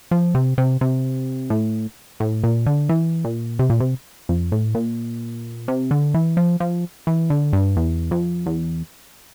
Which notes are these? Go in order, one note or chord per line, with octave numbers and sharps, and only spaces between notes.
F3
C3
C3
C3
A2
A2
A#2
D3
E3
A#2
C3
A#2
C3
F2
A2
A#2
C3
D3
E3
F3
F3
E3
D3
G2
E2
F2
E2